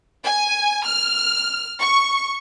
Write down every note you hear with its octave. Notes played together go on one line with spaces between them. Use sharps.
G#5
F6
C#6